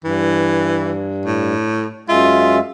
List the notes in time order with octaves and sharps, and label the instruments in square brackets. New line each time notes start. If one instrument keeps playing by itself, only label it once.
[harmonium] G2 [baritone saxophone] E3
[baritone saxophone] A2
[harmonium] F#2 G#3 E5 [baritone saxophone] F4